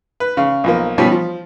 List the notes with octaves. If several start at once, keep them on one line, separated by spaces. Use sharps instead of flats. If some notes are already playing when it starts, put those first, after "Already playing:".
B4
C#3
B1 F3 A#3
B2 F3 G3 B3 C#4
F3